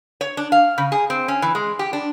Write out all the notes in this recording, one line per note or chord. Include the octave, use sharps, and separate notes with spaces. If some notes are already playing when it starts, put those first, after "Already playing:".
C#5
D4
F5
C#3
G#4
C4
C#4
E3
G#3
G4
D4